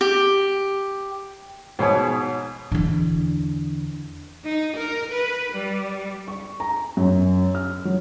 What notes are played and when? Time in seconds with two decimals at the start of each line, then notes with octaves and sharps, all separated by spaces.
0.01 G4
1.79 G#2 B2 C#5 G#5 D#6
2.72 E2 D3
4.45 D#4
4.76 A#4
5.12 B4
5.53 G3
6.28 C#6
6.60 A#5
6.97 F#2
7.55 F6
7.85 F#3